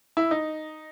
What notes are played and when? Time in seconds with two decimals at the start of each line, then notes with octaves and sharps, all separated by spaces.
0.17 E4
0.31 D#4